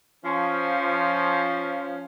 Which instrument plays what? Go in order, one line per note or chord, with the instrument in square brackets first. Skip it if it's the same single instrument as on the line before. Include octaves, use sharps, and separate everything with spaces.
[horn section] F3 C#4